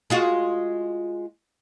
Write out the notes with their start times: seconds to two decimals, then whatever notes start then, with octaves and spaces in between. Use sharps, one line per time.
0.10 G#3 F4 F#4